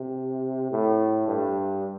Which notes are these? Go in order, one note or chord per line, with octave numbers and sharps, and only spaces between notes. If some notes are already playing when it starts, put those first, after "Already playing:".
Already playing: C3
A2
G2